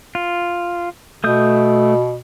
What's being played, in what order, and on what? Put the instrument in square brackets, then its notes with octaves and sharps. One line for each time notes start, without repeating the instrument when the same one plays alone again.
[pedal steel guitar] F4
[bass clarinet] B2 [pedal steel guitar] A3 D#6 G6